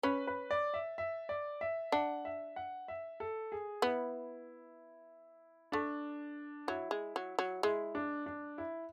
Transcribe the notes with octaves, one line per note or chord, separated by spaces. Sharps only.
C#4 B4
B4
D5
E5
E5
D5
E5
D4 F#5
E5
F#5
E5
A4
G#4
B3 E4
A3 D4
F#3 E4
G#3
F#3
F#3
G#3 E4
D4
D4
E4